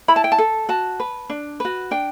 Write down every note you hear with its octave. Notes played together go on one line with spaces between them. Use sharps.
E4 B5
A5
G5
A5
A4
F#4 A5
B4
D4
F#4 B4
D4 G5